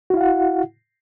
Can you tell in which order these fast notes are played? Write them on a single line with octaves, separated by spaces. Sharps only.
F#4 E4 F5 F#5